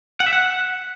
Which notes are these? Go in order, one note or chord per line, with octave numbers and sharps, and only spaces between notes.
F#5
E5
F#5